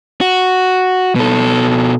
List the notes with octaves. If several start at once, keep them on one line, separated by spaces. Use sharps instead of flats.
F#4
B2 A4